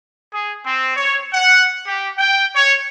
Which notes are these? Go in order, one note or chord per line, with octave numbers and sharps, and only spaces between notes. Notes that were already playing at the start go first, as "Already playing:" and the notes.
G#4
C4
C#5
F#5
G4
G5
C#5